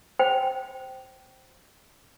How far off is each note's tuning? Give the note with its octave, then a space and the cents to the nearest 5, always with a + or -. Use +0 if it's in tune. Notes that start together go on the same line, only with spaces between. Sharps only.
C5 +0 G5 -20